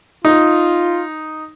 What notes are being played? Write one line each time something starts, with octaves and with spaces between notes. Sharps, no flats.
D#4 F4